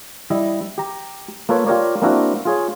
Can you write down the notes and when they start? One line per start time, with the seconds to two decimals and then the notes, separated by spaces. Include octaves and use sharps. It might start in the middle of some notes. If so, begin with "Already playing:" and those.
0.30 G3 E4 D#5
0.78 G4 A#5
1.49 A#3 F4 A4 B4 C#5
1.67 F4 G4 A#4 C#5 D5
2.02 A#3 C4 D4 E4 F#4 A#4
2.45 F4 G#4 C#5